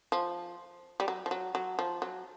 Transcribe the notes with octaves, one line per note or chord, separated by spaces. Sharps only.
F3
G3
F#3
F3
F#3
F#3
F3
F#3